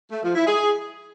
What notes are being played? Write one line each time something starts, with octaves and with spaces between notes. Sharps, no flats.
A3
F3
E4
G#4